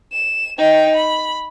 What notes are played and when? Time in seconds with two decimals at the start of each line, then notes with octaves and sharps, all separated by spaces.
0.13 E7
0.58 D#4 G5
0.96 B5